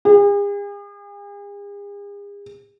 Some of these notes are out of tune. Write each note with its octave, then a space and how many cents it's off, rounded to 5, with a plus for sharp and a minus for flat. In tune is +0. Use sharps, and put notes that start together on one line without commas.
G#4 -45